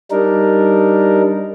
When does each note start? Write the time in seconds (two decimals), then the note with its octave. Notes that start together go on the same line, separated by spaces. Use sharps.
0.11 G3 D4 D#4 A#4